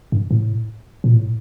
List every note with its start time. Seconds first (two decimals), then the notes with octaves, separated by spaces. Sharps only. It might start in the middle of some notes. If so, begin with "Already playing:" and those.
0.12 G2
0.31 A2
1.04 A#2
1.15 A2